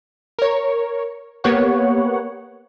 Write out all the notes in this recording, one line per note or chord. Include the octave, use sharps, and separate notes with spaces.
A#4 C#5
A#3 B3 G4 C#5 F#5